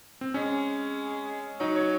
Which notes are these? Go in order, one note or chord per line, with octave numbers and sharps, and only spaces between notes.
C4
G#3 C#4
F#3 D#4
C#5